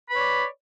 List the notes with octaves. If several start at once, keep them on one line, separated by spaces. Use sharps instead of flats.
B4 C#5 D5 B5